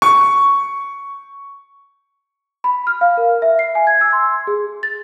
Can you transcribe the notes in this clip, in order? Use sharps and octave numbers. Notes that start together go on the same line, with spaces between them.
C#6
B5
F6
F5
A#4
E5
C7
G#5
G#6
E6
C6
G#4
A6